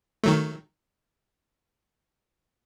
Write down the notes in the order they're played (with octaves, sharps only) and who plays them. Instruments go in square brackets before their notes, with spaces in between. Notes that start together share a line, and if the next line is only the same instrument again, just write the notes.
[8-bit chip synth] D#3 F#3 A3